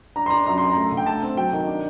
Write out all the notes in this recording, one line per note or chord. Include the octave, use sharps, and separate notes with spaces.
D4 A#5
C6
D4 A#5
F#2 A#5
F#2 C6
A#5
A3
D3
G5
A3 A5
C4
F#3 G5
D#3
D4